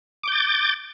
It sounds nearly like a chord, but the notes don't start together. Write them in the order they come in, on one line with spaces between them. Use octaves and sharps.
D6 G6 A6